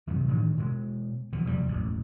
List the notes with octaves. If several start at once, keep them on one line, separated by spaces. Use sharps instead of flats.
F#2 C3 D#3
A2 D#3 E3 D4
B2 G#3
B2 D3 E3 F3
F1 E2 A#2 G3
E1 A1 F#2